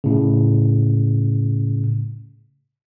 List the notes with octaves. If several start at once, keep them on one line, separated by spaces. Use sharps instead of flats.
A2 C#3